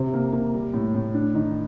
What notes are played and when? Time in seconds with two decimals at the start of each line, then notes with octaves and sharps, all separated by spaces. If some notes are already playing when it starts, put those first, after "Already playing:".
Already playing: C3 C4
0.14 A#3
0.33 A#3
0.54 G3
0.74 A2
0.95 A2
1.14 D4
1.35 D#3